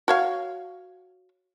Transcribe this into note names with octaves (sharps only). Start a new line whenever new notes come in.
F#4 C#5 F5